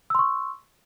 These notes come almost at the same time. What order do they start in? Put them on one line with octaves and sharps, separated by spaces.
E6 C6 C#6